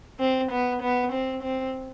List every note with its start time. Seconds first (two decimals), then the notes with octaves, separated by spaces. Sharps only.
0.20 C4
0.51 B3
0.82 B3
1.12 C4
1.43 C4